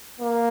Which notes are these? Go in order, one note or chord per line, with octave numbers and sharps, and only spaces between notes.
A#3